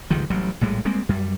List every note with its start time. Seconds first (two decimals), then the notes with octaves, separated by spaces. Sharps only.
0.10 G1 C#2 D#3 F3
0.30 A1 F#3 G3
0.61 A#1 A2 G3 G#3
0.85 G3 G#3 A#3 C4
1.09 F#2 G3